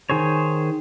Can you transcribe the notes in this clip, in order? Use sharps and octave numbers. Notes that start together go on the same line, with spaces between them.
D#3 G#4 C5 C#5